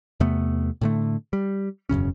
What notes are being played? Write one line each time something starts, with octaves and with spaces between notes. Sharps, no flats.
E2 C3 A3 B3
A2 D3 A3
G3
E1 F#2 C#3 C#4